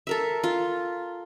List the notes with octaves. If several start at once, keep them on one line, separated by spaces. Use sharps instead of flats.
A4 A#4 E5
F4